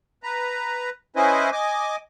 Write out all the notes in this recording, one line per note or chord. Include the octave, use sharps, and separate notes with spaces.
B4 A#5
C#4 E4 B4 C5 D#5 G#5
D#5 G#5 D6